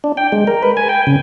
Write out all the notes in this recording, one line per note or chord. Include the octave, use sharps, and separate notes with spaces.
D4
G5
G#3
A#4
B4
G#5
G5
C#3